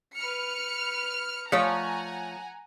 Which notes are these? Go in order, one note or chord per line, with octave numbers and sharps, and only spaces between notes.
B4 F6 C#7
F3 A3 C#5 F#5 G#5 A#5